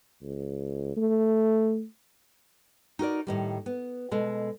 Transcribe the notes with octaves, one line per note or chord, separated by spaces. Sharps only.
C#2
A3
D#4 F#4 A#4 D5
A2 D#3 G3
B3
B2 G#3 A4